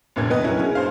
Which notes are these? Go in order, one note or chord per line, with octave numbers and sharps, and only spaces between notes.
F1 G2 A#2 D3 B3 G#6
B3 B4 D#5
F#3 C#4 E4 A#4
C#3 C#4
G2 C5 F5